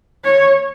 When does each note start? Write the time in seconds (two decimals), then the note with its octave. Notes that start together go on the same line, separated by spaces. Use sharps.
0.24 C#5